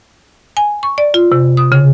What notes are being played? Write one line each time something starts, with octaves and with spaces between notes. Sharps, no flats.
G#5
C#6
D5
F4
C3
D#6
C#3